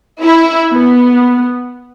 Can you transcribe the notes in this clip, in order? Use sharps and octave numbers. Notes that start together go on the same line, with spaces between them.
E4
B3